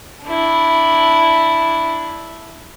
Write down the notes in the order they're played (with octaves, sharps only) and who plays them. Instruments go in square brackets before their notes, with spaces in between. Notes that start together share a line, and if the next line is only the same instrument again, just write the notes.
[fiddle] D4 E4